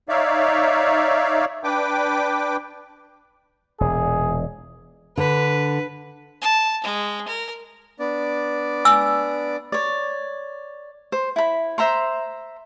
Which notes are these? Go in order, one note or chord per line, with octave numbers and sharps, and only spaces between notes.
D#4 C#5 D5 E5 F5
D4 B4 G5 D6
E1 A#2 G#4
D3 B4
A5
G#3
A#4
B3 D4 D5
G#5 E6
C#5 D5
C5
E4 B5
C5 E5 A#5 C6